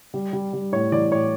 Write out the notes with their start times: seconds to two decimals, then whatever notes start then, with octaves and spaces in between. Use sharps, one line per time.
0.14 G3
0.33 G3
0.53 G3
0.72 A2 C#5
0.92 E3 D5
1.11 A2 C#5